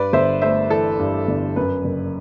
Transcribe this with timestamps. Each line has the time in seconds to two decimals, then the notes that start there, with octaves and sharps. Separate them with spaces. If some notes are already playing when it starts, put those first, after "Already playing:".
Already playing: G2 B4 D5
0.13 G1 C5 E5
0.42 A3 C5 E5
0.70 E3 A4
0.99 G2
1.28 G1
1.56 F#2 B4
1.85 F#1